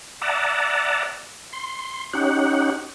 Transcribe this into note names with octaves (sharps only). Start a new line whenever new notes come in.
D5 E5 F#5 A5 A#5
C6
C#4 D#4 G4 F#5